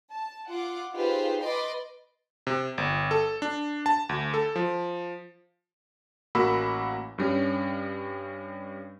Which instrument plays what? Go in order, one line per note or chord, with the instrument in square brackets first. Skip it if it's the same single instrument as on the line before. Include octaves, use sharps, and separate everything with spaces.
[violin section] A5
F4 F#5 D6
D#4 F4 G4 G#4 B4 C5
B4 D#5 B5 C6 D6 A6
[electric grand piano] C3
G1
A4
D4
A5
D2
A4
F3
A1 A#3 F#4 B5 E6
G2 G3 C#4